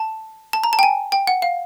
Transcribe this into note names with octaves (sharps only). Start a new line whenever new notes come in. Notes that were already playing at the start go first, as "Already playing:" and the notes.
Already playing: A5
A5
A#5
A5
G5
G#5
G5
F#5
F5